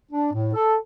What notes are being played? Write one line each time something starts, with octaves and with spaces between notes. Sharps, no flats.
D4
A2
A4